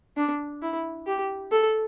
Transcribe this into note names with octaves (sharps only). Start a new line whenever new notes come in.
D4
E4
G4
A4